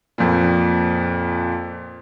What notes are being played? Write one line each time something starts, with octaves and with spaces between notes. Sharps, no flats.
F2 A#2